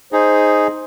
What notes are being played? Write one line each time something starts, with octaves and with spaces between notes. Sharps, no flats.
D#4 G#4 C5